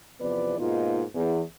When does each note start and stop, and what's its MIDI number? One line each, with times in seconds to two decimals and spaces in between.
0.20 0.57 40
0.20 0.57 48
0.20 0.57 53
0.20 0.57 59
0.20 0.57 71
0.20 0.57 74
0.58 1.02 44
0.58 1.02 47
0.58 1.02 58
0.58 1.02 63
0.58 1.02 65
1.14 1.41 40